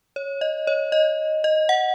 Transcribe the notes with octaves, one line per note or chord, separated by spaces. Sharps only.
C#5
D#5
C#5
D#5
D#5
F#5